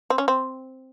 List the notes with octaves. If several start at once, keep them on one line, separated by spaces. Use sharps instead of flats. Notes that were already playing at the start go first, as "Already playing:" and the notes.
C4
C#4
C4